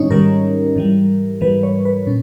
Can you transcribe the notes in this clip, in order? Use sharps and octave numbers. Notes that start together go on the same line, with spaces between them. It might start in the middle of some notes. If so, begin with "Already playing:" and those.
Already playing: G#2 D#3 G3 C#4 D#4 C#5
G#2 D#3 G3 A#4
G#2 E3 G3
G#2 E3 G3 B4
C#5
B4
A#2 C#4